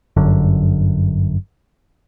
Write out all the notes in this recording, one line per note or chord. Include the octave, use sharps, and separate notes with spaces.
G1 F#2 D3